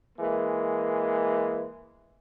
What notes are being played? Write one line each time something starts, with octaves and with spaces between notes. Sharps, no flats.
E3 G#3 A#3